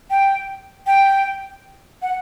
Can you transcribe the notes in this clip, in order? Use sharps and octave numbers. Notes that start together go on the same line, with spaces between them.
G5
G5
F#5